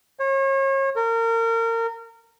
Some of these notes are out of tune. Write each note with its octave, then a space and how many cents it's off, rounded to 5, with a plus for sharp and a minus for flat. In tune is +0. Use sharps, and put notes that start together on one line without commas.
C#5 -35
A#4 -30